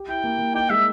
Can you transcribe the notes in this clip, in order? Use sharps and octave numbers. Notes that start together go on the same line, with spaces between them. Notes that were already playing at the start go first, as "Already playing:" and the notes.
Already playing: G4
E4 G5
A#3
A#3
D#4 G5
G#3 E5